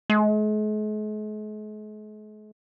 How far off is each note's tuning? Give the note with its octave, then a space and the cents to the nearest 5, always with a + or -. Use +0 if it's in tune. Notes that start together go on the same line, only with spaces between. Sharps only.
G#3 +45